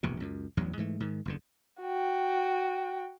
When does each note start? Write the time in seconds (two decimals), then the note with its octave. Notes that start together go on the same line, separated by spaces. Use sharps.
0.03 E1 A#1 G2 C3
0.20 C#2 F#2
0.57 A1 E2 G2 F#3
0.77 G#2 E3 A3
1.00 G#2 D#3
1.25 F#1 E2 D3
1.81 F#4 G5